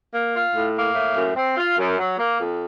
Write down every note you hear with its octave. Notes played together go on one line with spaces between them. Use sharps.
A#3
F4
A2
A#3
A2
F#2
C4
F4
F#2
F#3
A#3
F2